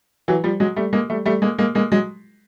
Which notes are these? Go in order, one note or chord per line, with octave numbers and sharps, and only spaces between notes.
E3 F#3
F3 G3
F#3 G#3
G3 A3
G#3 A#3
G3 A3
G3 A3
G#3 A#3
G#3 A#3
G#3 A#3
F#3 G#3